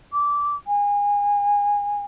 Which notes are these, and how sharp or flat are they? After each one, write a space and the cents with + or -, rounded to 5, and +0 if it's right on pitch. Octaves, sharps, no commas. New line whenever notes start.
D6 -15
G#5 -25